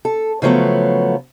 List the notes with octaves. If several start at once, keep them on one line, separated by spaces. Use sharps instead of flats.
A4
C#3 F3 F#3 A3 B3